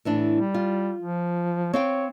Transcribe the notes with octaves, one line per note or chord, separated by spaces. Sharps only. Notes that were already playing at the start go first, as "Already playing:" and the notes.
A2 E3 D4
G3
F4
F3
C4 C#5 F5 G5